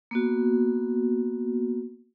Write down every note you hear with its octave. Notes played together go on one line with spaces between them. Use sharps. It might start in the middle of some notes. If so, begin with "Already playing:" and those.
A#3 B3 F#4